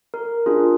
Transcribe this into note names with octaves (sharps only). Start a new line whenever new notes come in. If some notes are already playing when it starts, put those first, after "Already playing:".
A#4
D4 F4 G#4